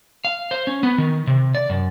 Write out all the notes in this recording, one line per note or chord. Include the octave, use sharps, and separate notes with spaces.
F5
C5
C#4
B3
D#3
C3
D5
F#2